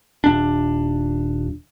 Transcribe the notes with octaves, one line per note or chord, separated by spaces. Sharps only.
D#1 D4